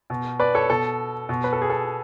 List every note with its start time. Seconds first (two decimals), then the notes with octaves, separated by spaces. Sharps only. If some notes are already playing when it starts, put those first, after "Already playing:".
0.10 B2
0.40 B4 D5
0.55 A4 C#5
0.70 B2 A4
1.29 B2
1.44 B4
1.53 A4
1.62 G#4
1.70 A4